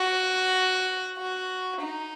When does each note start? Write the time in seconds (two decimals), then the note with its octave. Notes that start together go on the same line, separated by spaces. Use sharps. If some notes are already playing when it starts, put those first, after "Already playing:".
Already playing: F#4
1.18 F#4
1.80 D#4